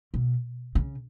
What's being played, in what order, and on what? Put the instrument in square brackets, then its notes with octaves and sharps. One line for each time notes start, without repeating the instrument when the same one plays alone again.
[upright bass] B2
C#3